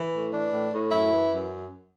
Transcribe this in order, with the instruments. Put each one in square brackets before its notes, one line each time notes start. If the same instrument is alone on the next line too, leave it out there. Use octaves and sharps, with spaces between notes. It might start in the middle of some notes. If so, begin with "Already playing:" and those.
Already playing: [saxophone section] E3
A2
E3 D4
A2
A2
F#2 E4
E3
F#2